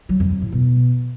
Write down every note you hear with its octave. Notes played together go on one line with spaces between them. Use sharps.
F#3
F2
F#3
A2
B2